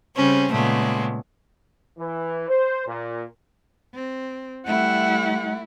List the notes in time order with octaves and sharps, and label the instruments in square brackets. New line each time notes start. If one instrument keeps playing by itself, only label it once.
[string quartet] C#3 G3 C4 C#4
A#2 C#3 G#3 A3 B3
[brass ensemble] E3
C5
A#2
[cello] C4
[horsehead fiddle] G3 F#5 [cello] A3 E4